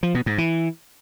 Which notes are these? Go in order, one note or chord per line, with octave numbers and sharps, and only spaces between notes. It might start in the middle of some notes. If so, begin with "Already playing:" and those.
F3
B2
G#2
E3